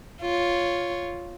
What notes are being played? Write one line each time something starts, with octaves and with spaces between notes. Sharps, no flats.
F4 C#5